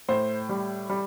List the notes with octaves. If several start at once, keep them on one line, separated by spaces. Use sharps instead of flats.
A2 C5
G3
G3